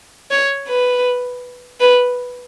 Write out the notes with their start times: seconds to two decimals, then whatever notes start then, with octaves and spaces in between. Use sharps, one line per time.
0.31 C#5
0.69 B4
1.80 B4